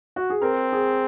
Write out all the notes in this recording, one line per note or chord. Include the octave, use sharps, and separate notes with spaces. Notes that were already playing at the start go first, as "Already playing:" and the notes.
F#4
G#4
C4 A#4
G#4